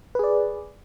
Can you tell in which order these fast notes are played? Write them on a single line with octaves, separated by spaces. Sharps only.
B4 G#4 D5